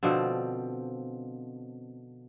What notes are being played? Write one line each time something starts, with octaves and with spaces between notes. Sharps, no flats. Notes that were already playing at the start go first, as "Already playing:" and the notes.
B2 D3 F3 C4